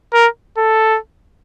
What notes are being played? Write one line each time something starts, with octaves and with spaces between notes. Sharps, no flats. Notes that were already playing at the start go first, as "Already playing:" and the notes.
A#4
A4